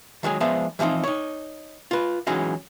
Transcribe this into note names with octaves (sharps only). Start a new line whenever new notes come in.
D#3 F#3 G#3 G#4
F3 G#3 B3 D4 C5 E5
E3 F3 G3 C4 D#4
D#4 C#5
F4 B4
E3 F#3 G#3 C#4 D#4 F#4